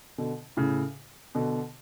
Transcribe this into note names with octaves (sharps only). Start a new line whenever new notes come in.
B2 D3
A2 C#3
B2 D3